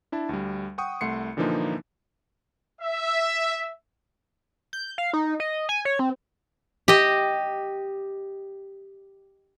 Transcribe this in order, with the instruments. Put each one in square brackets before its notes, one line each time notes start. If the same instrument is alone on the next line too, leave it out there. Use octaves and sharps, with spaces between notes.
[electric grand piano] D4 E4 A5
D2 G3
F#5 G5 C#6 D#6
C2 A3 F#5 C6 C7 C#7
A#2 D3 E3 F3 A#3 D#4
[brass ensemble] E5
[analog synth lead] G6
F5
D#4
D#5
G#5
C#5
C4
[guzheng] G4 D#5